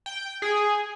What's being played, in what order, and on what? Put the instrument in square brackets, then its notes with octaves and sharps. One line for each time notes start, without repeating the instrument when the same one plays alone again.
[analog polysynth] G5
G#4